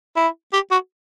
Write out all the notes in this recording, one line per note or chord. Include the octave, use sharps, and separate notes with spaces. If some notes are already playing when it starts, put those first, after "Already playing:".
E4
G4
F#4